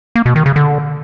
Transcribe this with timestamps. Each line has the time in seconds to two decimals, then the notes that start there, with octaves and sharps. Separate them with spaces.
0.15 A#3
0.26 B2
0.36 D#3
0.46 C#3
0.56 D3